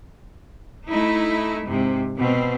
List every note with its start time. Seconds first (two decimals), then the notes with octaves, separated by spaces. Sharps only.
0.89 A3 D#4 E4
1.65 G#2 C3
2.18 B2 C4